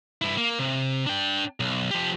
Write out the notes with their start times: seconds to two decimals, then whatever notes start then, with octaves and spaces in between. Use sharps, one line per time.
0.22 G2 E4
0.38 A#3
0.59 C3
1.07 D4 G5
1.60 B1
1.91 F3 G4